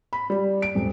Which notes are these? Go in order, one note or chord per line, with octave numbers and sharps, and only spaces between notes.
B5
G3
D7
D#1